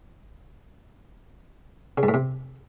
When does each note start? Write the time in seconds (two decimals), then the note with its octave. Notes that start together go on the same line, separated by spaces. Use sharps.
1.98 C#3
2.03 G#2
2.08 A2
2.14 C3